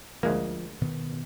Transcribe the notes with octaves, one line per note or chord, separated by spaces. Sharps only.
D2 F3 G#3 A#3
B2 D#3 B3